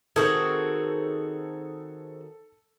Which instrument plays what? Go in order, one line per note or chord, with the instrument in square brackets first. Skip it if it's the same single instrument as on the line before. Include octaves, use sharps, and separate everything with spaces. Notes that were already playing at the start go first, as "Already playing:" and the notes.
[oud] D#3 [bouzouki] C4 F#4 G#4 [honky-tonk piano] A4